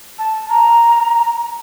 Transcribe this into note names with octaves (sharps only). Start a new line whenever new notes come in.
A5
A#5